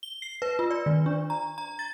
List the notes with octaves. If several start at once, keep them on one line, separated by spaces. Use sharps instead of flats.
G7
C7
B4
F4
D5
D#3
D4
A#5
A#5
A6